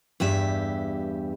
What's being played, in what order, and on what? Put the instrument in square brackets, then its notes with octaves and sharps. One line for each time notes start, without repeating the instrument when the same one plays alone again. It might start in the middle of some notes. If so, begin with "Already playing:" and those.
[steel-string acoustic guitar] E2 G2 G4 E5